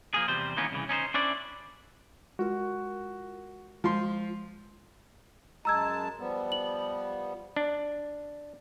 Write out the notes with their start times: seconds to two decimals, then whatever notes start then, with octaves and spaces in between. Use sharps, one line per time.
0.14 F3 A#3 G#4
0.28 E2 C3 G3 C5
0.56 D#3 E3 A#3 B3 C#4
0.71 C2 C#3 E3
0.89 C#4 D#4 E4 C5
1.14 C#4 D4 E4 C5 D5
2.39 G#3 F4 F#4 A#4
3.84 F3 G#3 C6
5.65 F#2 G#3 A5 A#5 E6 G#6
6.19 F3 G3 B3
6.52 F#7
7.56 D4